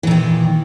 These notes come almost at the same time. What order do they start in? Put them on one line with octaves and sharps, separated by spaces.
E3 A#2 D#3